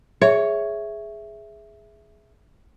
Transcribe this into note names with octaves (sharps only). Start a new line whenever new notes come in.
G#4 C#5 E5